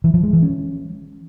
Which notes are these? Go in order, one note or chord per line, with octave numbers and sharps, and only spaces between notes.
E3
F3
G#3
E3
C#4